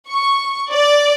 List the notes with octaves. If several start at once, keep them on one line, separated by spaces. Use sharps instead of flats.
C#6
D5